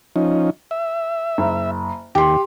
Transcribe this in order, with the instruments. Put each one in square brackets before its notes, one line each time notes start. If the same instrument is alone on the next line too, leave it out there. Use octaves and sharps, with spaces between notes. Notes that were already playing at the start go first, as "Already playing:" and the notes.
[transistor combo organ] F3 C#4 D#4
E5
[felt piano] F#1
[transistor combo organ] D#2 [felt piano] G4 C6